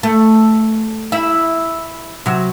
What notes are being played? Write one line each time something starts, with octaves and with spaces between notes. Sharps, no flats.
A3
E4 E5
C3 F#3